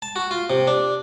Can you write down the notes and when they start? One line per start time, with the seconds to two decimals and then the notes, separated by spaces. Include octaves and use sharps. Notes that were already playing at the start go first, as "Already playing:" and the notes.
0.02 A5
0.16 F#4
0.31 F4
0.50 C3
0.67 D4